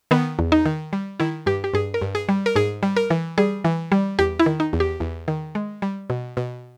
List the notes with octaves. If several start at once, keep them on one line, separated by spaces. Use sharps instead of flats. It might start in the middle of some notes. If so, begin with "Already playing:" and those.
D#3 B3
E2
D#4
D#3
G3
D#3 E4
G2 G4
G4
G2 G#4
A#4
G2
G#4
G3
A#4
G#2 G#4
G3
A#4
E3
G3 G#4
E3
G3
E2 G4
E4
D#3
D#4
E2
G4
E2
D#3
G#3
G3
B2
B2